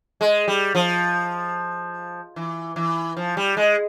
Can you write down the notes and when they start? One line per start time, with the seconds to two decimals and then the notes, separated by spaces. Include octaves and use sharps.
0.21 G#3
0.48 G3
0.75 F3
2.36 E3
2.76 E3
3.17 F3
3.37 G3
3.57 G#3